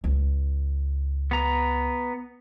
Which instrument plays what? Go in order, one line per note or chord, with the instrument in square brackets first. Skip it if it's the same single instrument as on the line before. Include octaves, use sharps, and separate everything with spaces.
[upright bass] C#2
[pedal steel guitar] B3 A#5